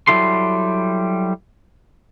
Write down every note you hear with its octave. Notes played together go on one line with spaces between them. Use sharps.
F#3 G3 E4 A4 C6